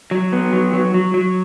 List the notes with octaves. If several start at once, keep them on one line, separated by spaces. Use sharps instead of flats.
F#3
B3
F#3
F#3
F#3
F#3